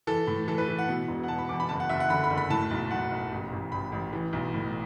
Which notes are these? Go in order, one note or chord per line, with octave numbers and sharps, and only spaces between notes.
E3 A4
A2
E3 A4
B4
E3
F#5
B2
E1
F#5
E1 A5
B5
E2 D6
B5
F#1 A5
F#5
F#1 E5
F#5
D3 B5
B5
F#1
B5
A2 A5
B1
B1 F#5
B1
A1
A1
A1 B5
A1
E3
B1
A2